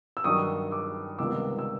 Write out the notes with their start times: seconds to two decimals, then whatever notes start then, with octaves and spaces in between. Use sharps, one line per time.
0.17 E6
0.24 G2 D#3 F#3 C#6 D#6
0.71 D6 E6
1.18 C#2 C3 D#3 G3 B3 D6 E6
1.59 E6